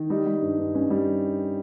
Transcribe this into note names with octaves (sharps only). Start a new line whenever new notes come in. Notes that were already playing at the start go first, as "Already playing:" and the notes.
Already playing: D#3
G3 D#4
G3
G2
G2
G2 C#4
G3